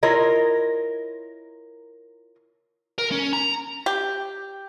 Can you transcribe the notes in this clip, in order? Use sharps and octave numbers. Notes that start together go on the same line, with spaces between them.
E4 F4 A#4 C#5 D#5
A#4
C#4
A#5
G4